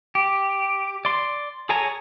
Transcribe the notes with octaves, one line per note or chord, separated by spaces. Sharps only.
G4
D5 C6
G#4 A4 C#5 G#5 A#5